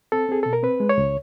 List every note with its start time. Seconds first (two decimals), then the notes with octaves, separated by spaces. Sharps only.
0.12 C4 A4
0.29 C4 G#4
0.43 B2 A4
0.53 A#4
0.63 C4 B4
0.80 G#3
0.89 C#5
0.98 C#2